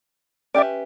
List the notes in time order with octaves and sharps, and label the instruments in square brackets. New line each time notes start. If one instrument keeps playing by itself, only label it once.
[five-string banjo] C#4 G4 B4 E5 [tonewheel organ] D5